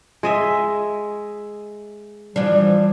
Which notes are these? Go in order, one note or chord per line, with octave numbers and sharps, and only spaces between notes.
G#3 D#5 E5
E3 F3 G3 D4